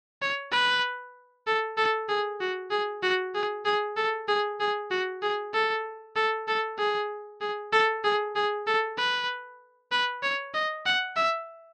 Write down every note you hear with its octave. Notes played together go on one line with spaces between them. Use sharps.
C#5
B4
A4
A4
G#4
F#4
G#4
F#4
G#4
G#4
A4
G#4
G#4
F#4
G#4
A4
A4
A4
G#4
G#4
A4
G#4
G#4
A4
B4
B4
C#5
D#5
F#5
E5